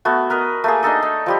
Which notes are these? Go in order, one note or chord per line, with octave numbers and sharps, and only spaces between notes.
A3 B3 F#4
A#4 B4 D#5
A3 A#3 G#4
D4 D#4 A4 D#5
D#4
F3 G3 G4